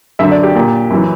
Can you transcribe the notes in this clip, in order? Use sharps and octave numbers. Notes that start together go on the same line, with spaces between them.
F#2 D3 E5
D5
G4
A#2
F#2 E3